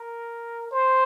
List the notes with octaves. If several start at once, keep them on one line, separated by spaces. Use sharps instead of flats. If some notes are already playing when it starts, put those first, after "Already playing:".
Already playing: A#4
C5